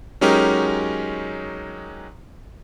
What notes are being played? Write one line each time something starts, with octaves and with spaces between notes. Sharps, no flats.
F#3 G#3 C#4 D#4 G4 A#4